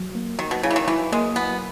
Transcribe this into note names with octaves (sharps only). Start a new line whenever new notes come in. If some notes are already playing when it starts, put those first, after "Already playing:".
Already playing: F#3
A#3
D#3 F#3
B2
C#3 E4
E3
D#3
E3 F#3
G#3 A#3
F#3 B3